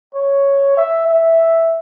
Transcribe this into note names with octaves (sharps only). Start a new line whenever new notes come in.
C#5
E5
E5